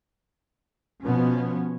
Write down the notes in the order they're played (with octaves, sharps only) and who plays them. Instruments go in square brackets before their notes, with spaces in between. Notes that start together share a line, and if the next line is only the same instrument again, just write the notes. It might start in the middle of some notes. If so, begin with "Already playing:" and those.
[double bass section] B2 F3 B3 C#4